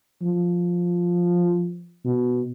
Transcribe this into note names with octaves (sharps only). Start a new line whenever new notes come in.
F3
B2